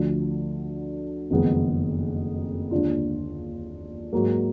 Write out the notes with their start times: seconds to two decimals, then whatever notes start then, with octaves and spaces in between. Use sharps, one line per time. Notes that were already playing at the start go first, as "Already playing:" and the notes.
Already playing: D2 D3 F3
1.30 F#1 F2 D#3 G#3 B3
2.71 D#2 D3 G#3 D4 F4
4.13 G#2 F#3 A#3